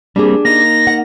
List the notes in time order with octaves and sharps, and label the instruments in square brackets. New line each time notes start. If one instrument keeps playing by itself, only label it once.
[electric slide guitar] G3 A#3 C4 [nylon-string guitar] D4 G4 G#4
[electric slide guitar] A#3 D#4 [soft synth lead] A#6
[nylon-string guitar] F#5